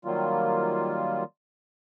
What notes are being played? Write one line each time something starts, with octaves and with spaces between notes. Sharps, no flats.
D#3 F#3 G3 A#3 F4